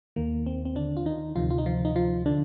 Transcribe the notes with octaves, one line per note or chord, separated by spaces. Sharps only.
D#2 D#3 A#3
C4
C4
D3 D4
F4
D#3 D#4
D2 C3 D#3 F3 F4
F4
D#4
F3 F4
D#4
F3 F4
D3 D4